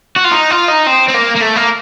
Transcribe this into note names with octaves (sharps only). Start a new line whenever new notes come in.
F#4
F4
D#4
F4
D#4
C4
C4
A#3
A#3
A3
A#3